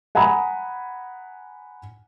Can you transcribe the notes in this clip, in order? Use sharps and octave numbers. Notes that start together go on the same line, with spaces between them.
F#5 G#5 A#5 B5 D#6